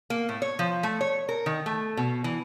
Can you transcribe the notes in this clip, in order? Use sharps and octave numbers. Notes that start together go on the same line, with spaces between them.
A#3
A2
C#5
F3
A3
C#5
A#4
D#3
A3
B2
E3